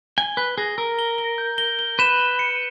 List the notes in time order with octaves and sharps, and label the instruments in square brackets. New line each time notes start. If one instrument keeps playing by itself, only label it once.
[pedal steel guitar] G#5 [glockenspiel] G7
[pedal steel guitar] B4 [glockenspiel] G7
[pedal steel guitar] G#4 [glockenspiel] A#6
[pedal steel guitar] A#4 [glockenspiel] E6
[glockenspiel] G7
G7
G6
G7
G7
[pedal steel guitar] B4 [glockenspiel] E7
[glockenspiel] G7
C#7